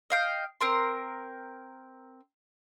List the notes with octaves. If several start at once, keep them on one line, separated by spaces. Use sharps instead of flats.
D#5 F5 G5
C4 A#4 C6